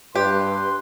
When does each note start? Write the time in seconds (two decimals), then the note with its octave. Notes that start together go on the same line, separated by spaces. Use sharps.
0.15 G2 G4 B4 C6